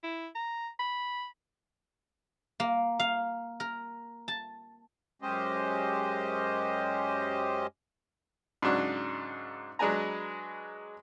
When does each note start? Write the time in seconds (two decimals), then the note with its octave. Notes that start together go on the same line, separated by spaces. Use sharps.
0.04 E4
0.35 A#5
0.80 B5
2.60 A#3
2.99 F5
3.60 A#4
4.28 A5
5.22 F#2 G#3 C#4 G4 C5 D#5
8.62 G#2 C#3 F#3 D4 F#4
9.79 F#3 G#3 D4 B4 G#5 A#5